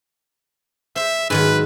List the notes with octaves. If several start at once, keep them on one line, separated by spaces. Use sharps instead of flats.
C5 E5
G#2 D#3 F#3 B4